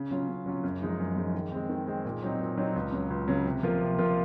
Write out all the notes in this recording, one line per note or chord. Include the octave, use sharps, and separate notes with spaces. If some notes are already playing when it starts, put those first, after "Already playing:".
Already playing: C#3
F#3 C#4 F4
C#3
F#3 C#4 F4
F#2
F3 G#3 D#4
F#2
F3 G#3 D#4
D#3
G#3 C4
D#3
G#3 C4
A#2
F#3 C4 D#4
A#2
F#3 C4 D#4
C#2
C#3 F#3
C#2
C#3 F#3
C3
F3 A#3 F4
C3
F3 A#3 F4